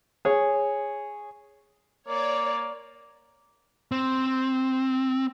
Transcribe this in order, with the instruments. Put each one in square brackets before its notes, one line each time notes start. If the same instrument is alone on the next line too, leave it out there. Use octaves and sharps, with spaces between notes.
[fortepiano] G#4 C#5
[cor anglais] A#3 [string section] C#5 D5
[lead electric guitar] C4